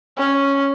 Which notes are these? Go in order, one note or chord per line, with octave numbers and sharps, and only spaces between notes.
C#4